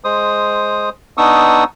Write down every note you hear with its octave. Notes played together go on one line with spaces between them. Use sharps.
G#3 C5 D#6
B3 D4 D#4 C#6 D#6 E6